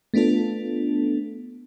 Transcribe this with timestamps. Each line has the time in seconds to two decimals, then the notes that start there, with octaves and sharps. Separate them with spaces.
0.14 A3 B3 D4 F4 A4